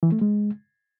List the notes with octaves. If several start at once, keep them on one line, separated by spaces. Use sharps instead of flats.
E3
A3
G#3